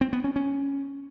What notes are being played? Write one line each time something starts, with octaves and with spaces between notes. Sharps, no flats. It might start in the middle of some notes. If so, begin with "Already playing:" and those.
C4
B3
C#4
C#4